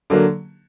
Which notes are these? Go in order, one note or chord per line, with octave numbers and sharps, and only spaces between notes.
D3 F#3 A#3